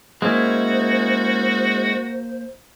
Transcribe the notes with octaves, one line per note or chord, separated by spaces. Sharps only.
G#3 A#3 C#4 E4 F#4 C5